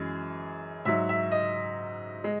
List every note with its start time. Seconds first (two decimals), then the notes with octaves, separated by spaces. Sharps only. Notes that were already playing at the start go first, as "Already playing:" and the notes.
Already playing: F#2 E3 G#3 G#4
0.85 G#2 F#3 E5
1.09 E5
1.32 D#5
2.24 G#3